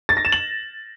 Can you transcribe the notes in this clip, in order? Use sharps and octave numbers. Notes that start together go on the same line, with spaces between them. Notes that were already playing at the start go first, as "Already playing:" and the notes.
A6
A#6
E7
F#7